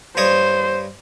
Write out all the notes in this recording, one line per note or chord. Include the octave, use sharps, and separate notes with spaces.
G2 C5 C#5 D#6